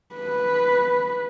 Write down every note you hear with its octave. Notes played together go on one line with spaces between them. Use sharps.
B4